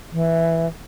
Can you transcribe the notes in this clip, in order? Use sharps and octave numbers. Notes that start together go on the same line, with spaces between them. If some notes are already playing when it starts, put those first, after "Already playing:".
E3